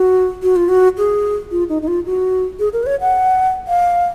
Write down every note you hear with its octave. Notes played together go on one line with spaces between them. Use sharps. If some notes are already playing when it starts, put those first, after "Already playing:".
Already playing: F#4
F#4
F4
F#4
G#4
F4
D#4
D#4
F4
F#4
G#4
A#4
B4
C#5
F#5
F5